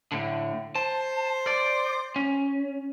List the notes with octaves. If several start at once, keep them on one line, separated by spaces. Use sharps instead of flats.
A2 D3
C5 A5
D5
C#4